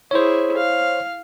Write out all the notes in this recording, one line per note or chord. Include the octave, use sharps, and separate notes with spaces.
E4 G#4 C5 C#5
F5